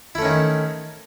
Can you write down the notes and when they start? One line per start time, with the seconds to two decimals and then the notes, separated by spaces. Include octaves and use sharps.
0.15 E4
0.18 A3
0.22 C#4
0.25 D#3